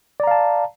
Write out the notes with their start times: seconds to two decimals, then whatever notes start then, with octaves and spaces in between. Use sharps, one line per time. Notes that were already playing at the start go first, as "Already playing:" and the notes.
0.20 D5
0.24 A#5
0.27 F5
0.31 A5